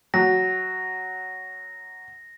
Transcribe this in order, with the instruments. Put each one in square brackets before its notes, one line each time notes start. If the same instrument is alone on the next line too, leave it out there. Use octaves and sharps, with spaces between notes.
[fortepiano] F#3 [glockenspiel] A#6